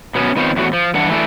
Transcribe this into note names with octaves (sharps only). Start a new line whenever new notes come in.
B2 B3 C#4
D#3 B3 C4 F4 C5 C#5
E2 A2 F#4
F3
G2 E3 D4 F#5
E3 A3 D4